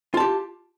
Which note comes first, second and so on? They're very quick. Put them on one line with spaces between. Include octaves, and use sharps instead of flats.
F4 A5 G4